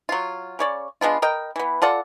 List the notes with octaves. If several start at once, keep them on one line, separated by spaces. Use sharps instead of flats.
F#3 F4
C#3 C#5 D5
G#3 B3 D4 F4
A#4 D#5 G5
E3 B3
F4 A4 D5 F#5